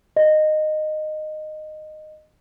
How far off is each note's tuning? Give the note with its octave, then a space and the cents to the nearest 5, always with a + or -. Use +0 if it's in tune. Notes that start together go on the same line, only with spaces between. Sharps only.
D#5 -15